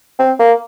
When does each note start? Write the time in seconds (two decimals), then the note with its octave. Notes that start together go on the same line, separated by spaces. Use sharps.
0.19 C4
0.39 A#3